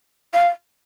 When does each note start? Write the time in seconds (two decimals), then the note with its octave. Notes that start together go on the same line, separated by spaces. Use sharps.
0.34 F5